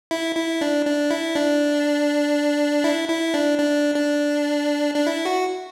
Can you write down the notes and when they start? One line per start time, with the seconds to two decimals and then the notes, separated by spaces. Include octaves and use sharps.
0.11 E4
0.36 E4
0.61 D4
0.85 D4
1.11 E4
1.36 D4
2.84 E4
3.09 E4
3.34 D4
3.58 D4
3.96 D4
4.95 D4
5.07 E4
5.25 F#4